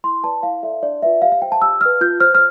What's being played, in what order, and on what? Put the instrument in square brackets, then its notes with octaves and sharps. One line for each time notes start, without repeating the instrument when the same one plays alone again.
[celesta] E4 C6
B4 D5 A5
E4 F5
A4 D5 E5
D4 D5
F4 B4 D5 E5
G4 F5
F5
C5 G5
A5
G4 E6
B4 D5 F6
F4 G6
C5 F6
F6